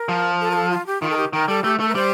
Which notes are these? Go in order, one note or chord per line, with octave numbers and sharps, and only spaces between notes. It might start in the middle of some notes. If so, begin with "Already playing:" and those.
Already playing: A#4
F3
A4
A#4
A4
F4
G4
D#3 F4
A4
G4
D#3 A#4
G3 A4
A3 G4
A3 A4
A#4
G3 C5